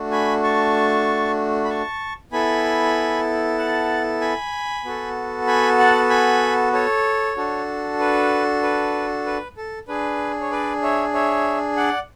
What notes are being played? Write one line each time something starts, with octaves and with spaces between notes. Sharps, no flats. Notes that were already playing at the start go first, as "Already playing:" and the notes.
Already playing: A3 D4 F#4
G#5 B5
A5 C#6
B5
A5 C#6
B3 E4 A4 G#5 B5
F#5 A5
G#5 B5
B3 F#4 A4
G#5 B5
F#5 A5
G#5 B5
A4 C#5
D4 F#4 A4
B4
B4
B4
A4
D4 G#4 B4
C#5
B4 D5
C#5 E5
C#5 E5
D5 F#5